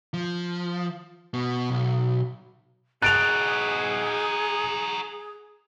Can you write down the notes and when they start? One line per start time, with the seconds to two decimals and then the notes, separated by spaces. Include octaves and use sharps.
0.14 F3
1.34 B2
1.71 B1
3.02 D#4 F#4 G#4 F#6 A6 D7 F7